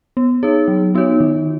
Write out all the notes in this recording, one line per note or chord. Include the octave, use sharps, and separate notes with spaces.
B3
D#4 G#4 C#5
F#3
B3 D#4 F#4 C#5
D#3